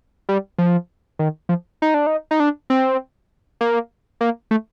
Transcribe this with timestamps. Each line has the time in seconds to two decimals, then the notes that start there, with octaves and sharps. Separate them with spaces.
0.29 G3
0.58 F3
1.19 D#3
1.49 F3
1.82 D#4
1.94 D4
2.07 D#4
2.31 D#4
2.40 D4
2.70 C4
3.61 A#3
4.21 A#3
4.51 A3